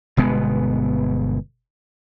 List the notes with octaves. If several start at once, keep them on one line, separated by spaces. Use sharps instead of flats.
G1 B2 G#3 B3